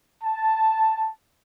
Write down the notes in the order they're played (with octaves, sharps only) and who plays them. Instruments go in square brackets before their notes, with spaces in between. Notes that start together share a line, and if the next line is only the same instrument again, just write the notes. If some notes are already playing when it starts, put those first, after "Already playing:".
[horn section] A5